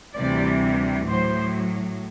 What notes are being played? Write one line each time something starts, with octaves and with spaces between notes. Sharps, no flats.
D2 C3 E3 G3 D5
A2 F#3 C5